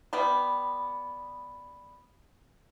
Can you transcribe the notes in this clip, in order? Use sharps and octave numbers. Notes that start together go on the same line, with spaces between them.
G3 B3